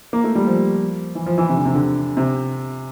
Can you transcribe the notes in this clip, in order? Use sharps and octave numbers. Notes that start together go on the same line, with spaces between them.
A#3
A3
G3
F3
E3
F3
E3
C3
D3
C3
D3
C3